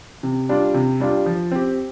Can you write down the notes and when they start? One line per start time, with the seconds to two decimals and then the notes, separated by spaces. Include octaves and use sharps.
0.23 C3
0.49 G3 D4 F4
0.74 C3
1.00 G3 D4 F4
1.26 F3
1.51 C4 G4